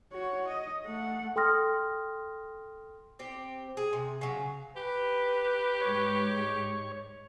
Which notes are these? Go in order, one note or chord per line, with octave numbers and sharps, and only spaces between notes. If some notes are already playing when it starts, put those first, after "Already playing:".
F#4 C#5
D#5
A3 F#5
A4 G5 C6 D#6 F6 A#6
C4 G4
G#4
C3
C#3 F#3
G4 B4
G#2 G#3 C#5